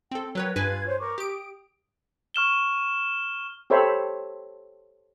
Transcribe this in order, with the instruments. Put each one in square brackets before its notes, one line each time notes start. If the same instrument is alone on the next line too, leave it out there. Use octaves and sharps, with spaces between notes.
[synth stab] C4 A4 [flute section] G5
[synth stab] F#3 B4 C#5 [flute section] A#4 G5
[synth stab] G2 B4 G#5 [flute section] F4 G#6
[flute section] C5 C#5
A#4 C#6 D6
[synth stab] G4 D7 [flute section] D#6
[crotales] C#6 F6 E7 G7
[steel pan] G4 A4 C5 C#5 E5 B5